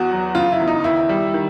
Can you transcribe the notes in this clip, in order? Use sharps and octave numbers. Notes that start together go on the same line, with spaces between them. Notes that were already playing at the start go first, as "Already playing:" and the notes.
Already playing: E2 F#4
F#3
C#3 F4
E4
E2
D#4
D#3 E4
G3
D#3